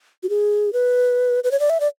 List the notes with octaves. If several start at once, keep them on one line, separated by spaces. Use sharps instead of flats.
F#4
G#4
B4
B4
C#5
D5
E5
D5